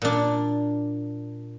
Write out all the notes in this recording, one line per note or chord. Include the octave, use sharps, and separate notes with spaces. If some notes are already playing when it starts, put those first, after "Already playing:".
A#2 D4